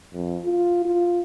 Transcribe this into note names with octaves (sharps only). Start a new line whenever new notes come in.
F2
F4
F4